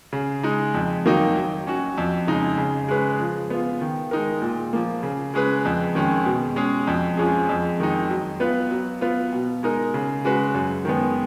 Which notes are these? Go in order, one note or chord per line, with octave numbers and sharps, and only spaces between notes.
C#3
G#3 D#4
F2
D#3 F#3 A#3 D#4
F#3
C#4 F#4
F2
C#3 G#3 D#4
C#3
G#3 C#4 G#4 B4
F3
B3 F4
D#3
G#3 D#4 A#4
A#2
F3 A#3
C#3
G#3 C#4 G#4 B4
F2
D#3 G#3 C#4
B2
G#3 C#4 G#4
F2
F3 G#3 C#4 G#4
F2
D#3 G#3 D#4
F#3
B3 F4 B4
F#3
B3 F4 B4
B2
G#3 D#4 A#4
C#3
G#3 C#4 F#4 B4
F#2
D#3 G#3 B3